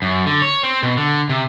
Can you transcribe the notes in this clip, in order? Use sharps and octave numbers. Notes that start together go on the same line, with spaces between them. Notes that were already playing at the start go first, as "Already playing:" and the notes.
F#2
D3
C#5
C4
B2
D3
C3